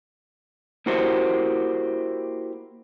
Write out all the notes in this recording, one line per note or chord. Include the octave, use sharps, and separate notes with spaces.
A#3 E4 F#4 G4 C5